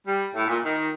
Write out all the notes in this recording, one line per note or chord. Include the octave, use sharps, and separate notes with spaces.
G3
A2
A#2
D#3